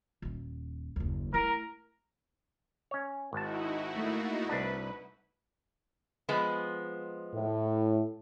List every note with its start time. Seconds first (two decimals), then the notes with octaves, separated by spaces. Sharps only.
0.22 D#1 D#2
0.96 F#1 D#2
1.34 A3 E4 A#4
2.91 C#4 C#5
3.33 G#1 D#4 E4 F#4 A5
3.94 A3 A#3
4.49 C2 D4 B4
6.29 F3 G#3 B3
7.35 A2